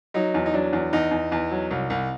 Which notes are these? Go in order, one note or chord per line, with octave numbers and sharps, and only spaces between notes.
F#3 D#4
E2
D#4
F#3 D4
E2
E2 D#4
E2
E2
F#3
C2
C2